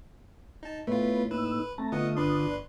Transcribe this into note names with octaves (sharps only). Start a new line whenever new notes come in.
D#4 A5
A2 A3 B3 F4 B4
A#3 D#4 B4 E6
A3 C4 A5 A#5
D3 B3 F4 D#5 F#5 D#6
G1 D4 B4 C6